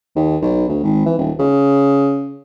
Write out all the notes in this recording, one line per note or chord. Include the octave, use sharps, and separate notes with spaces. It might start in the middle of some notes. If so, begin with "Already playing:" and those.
D#2
B1
D2
G#1
E3
D#1
C#3